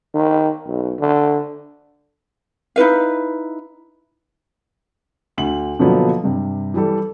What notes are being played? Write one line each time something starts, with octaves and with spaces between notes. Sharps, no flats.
D#3
B1
D3
D#4 E4 B4 F5
D2 F#7
B2 D3 F3 F#3 A#3 B3
G2 C3
E3 G3 A4